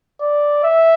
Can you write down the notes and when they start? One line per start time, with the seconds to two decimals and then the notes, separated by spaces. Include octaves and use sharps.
0.21 D5
0.64 E5